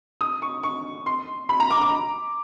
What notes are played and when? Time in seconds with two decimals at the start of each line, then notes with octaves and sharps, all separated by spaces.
0.21 D#6
0.42 C#6
0.63 C#6
1.06 C6
1.49 B5
1.60 A#5
1.70 D6
1.81 D6